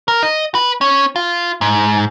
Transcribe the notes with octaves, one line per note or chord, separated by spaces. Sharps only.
A#4
D#5
B4
C#4
F4
G#2